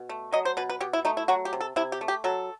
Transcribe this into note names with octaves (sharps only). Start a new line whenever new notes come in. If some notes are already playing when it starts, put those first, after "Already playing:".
Already playing: B2
A3
F#3 D#5
C5
B2 B4
B4
B2 G4
E4
A3 D#4
E4
F#3 F#4
G4
C3
A4
C3 E4
G4
A3
G4
F#3 A4